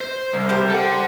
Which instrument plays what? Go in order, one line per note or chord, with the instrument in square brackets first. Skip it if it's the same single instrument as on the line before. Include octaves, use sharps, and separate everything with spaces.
[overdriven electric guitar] C5
C2
[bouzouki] G4 A#4 C5
[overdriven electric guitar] A4 F#5